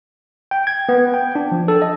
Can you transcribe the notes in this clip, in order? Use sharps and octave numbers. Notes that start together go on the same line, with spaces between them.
G5
G#6
B3
G5
D4
F3
A4
D#5